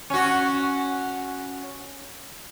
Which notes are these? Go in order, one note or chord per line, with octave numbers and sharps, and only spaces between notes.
C#4 F#4